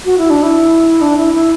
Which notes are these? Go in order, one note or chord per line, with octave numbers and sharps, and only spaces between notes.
F#4
E4
D4
E4
D4
E4
E4